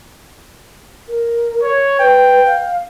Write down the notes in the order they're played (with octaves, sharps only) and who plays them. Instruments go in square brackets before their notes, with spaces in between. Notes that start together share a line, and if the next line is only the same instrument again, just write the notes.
[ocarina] A#4
[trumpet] C#5
[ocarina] B4 [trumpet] G5
[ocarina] F5